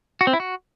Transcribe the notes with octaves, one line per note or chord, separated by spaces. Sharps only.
F#4
C4
E4
F#4